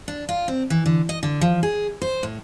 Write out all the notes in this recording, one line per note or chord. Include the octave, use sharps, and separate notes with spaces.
D4
F4
C4
E3
D3
D#5
D3
F3
G#4
C5
A2